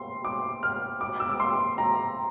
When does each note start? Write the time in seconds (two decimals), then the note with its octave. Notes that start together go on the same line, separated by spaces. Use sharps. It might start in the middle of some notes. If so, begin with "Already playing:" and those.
Already playing: C6
0.25 D6
0.63 F6
1.01 D6
1.20 E6
1.29 D6
1.40 C6
1.78 A#5